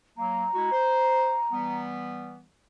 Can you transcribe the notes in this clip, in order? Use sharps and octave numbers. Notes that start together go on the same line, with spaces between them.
F#3 A#3 A#5
G#3 E4 F#4
C5
E3 G3 B3